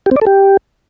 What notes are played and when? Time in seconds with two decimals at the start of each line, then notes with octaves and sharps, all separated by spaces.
0.06 G4
0.11 C4
0.16 D5
0.21 A4
0.27 G4